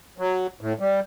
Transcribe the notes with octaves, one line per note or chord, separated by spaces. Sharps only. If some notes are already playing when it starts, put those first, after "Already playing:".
F#3
A2
G3